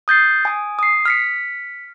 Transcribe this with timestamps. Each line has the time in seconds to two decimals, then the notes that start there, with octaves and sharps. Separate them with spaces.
0.08 D#6 G6 A6 C7
0.45 G#5 D#6
0.79 D#6 C7
1.05 F6 B6 C#7